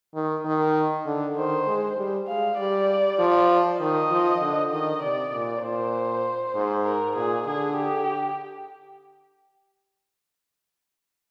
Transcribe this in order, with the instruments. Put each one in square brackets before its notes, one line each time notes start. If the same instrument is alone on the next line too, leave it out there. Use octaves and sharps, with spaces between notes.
[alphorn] D#3
D#3
D3
[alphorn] D#3 [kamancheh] C5
[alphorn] G#3
G3
[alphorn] G#3 [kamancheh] F5
[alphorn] G3 [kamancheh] D5
[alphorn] F3
[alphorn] D#3 [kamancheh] D#5
[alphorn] F3
D3
[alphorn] D#3 [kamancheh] D#5
[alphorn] C3 [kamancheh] D5
[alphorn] A#2
[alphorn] A#2 [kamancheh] C5
[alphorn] G#2
[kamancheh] A#4
[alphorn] A#2 [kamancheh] G#4
[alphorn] D3 [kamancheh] G#4
[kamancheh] G4